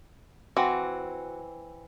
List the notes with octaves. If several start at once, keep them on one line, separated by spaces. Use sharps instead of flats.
E3 C4 F#4